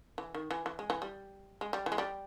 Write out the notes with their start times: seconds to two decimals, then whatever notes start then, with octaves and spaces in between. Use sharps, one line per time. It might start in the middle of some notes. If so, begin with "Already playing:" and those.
0.18 E3
0.35 D#3
0.51 E3
0.66 E3
0.79 G#3
0.90 E3
1.02 G3
1.61 G#3
1.73 G3
1.86 E3
1.92 G#3
1.98 G3